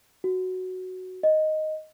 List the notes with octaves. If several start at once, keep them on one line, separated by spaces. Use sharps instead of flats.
F#4
D#5